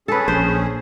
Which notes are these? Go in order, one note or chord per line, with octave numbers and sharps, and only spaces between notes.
C#4 G#4 A4 B4
A#1 C5